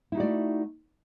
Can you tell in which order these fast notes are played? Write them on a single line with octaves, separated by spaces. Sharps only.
E4 D#4 F#4 D5 A3